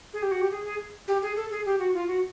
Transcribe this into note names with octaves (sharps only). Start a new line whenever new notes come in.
G#4
G4
F#4
G4
G#4
G#4
G4
G#4
A4
G#4
G4
F#4
F4
F#4